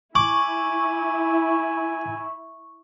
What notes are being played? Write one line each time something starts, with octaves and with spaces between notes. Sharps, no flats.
E4 G#5 C#6 D6